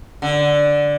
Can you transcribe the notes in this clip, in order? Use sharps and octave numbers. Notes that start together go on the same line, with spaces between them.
D3